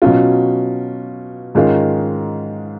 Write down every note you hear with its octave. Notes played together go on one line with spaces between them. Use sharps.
B2 F#3 C#4 F4
G#2 D#3 G#3 C#4 F4